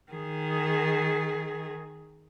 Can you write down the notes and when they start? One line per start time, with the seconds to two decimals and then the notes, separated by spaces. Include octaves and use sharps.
0.12 D#3 G#4